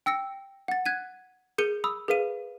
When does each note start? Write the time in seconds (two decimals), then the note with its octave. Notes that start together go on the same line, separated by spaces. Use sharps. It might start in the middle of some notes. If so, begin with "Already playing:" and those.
0.06 G5 E6 A#6 C#7
0.68 F#5 A6
0.86 F#6 G#6 B6 D#7
1.58 G#4 A#4 G6 C#7 D#7 G7
1.84 B5 D#6 E6
2.08 G#4 A#4 B4 F5 D#7